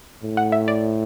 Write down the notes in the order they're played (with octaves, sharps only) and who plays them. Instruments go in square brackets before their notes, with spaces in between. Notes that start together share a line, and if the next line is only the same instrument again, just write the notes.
[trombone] A2
[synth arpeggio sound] F#5
E5
D5